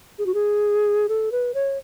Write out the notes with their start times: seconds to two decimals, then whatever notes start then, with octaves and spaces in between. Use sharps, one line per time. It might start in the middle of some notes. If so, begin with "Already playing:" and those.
0.19 G#4
0.26 F#4
0.34 G#4
1.09 A4
1.32 B4
1.54 C#5